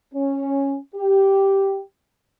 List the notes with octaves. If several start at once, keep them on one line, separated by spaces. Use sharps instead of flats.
C#4
G4